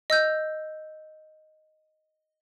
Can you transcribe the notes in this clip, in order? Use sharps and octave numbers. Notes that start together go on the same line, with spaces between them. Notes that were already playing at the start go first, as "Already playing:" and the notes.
D#5 E6 G6